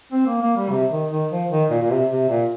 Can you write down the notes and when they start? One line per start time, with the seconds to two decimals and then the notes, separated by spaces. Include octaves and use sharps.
0.12 C4
0.26 A#3
0.41 A#3
0.57 G3
0.70 C3
0.91 D#3
1.11 D#3
1.31 F3
1.50 D#3
1.70 A#2
1.82 A#2
1.90 C3
2.11 C3
2.29 A#2